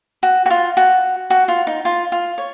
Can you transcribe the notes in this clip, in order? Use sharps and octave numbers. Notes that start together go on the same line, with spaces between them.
F#4
F#4
F4
F#4
F#4
F4
D#4
F4
F4
C#5